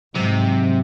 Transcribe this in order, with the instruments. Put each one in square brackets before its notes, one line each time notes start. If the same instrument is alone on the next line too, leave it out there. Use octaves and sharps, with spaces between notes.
[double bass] G#2 [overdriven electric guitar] C3 [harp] F#3